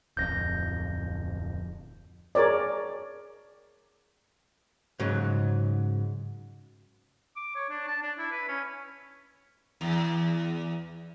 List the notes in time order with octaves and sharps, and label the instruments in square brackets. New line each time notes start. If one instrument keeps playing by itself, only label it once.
[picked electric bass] D1 F2 [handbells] G6 A#6
[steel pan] G#4 A#4 C#5 D5
[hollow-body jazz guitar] G#2 C#3 F#3
[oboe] D6
C#5
D4
A5
D4
E4
B4
C#4
[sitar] E2